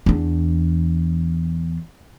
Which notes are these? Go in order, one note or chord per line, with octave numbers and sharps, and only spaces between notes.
E2 D4